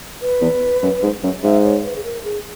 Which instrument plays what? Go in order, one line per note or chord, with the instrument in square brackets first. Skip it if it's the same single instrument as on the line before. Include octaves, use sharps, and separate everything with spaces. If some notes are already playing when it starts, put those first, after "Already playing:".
[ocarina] B4
[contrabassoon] E2
F#2
G#2
F#2
[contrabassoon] G#2 [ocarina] E5
[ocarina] C#5
B4
G#4
A#4
G#4